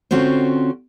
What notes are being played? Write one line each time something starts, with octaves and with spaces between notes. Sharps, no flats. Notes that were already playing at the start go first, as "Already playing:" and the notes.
D3 C4 C#4 F4 F#4 C5